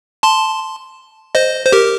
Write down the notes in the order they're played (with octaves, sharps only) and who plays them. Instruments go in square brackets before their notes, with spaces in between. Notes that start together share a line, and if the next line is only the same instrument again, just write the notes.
[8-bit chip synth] A5 C6
C5 D#5
C5
G4 A#4